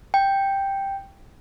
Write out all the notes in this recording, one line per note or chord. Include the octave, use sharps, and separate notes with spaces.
G5